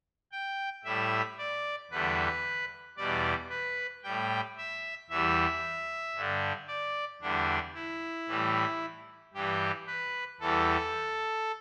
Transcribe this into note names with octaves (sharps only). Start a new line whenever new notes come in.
G5
A2 G3 E5
D5
E2 D3 G3 B4
E2 B2 G3 D5
B4
A2 G3 G5
E5
E2 E3 G3 E5
G2 D3 G3
D5
E2 D3 G3 D4
E4
A2 E3 G3
G2 E3 G3 G4
B4
E2 E3 G3 A4